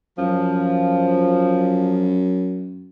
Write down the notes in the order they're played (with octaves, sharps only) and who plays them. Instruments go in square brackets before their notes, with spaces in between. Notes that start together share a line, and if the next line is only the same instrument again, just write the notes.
[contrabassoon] F#2 [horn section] F3